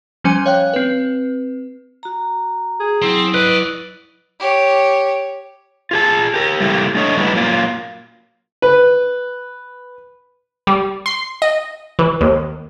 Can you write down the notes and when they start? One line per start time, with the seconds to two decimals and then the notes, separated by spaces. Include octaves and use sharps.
0.24 F3 G3 C#4 C5 G#5 D#7
0.46 C#5 F5 G5 F#6
0.73 C4 B4
2.03 F#4 A#5
2.80 G#4
3.02 F#3 C4 E4 D#6
3.34 B4 D5 D#5
4.40 G4 C#5
5.91 F4 G#4 A5
6.34 G4 A#4
6.60 G3 A3 A#3 E4 G4
6.95 A3 D4 C#5 D#5
7.17 G3 C#4 D#4 E4 F#4 B4
7.35 F#3 A#3 F4
8.62 B4
10.67 G3
11.06 C6
11.42 D#5
11.99 E3
12.21 D#2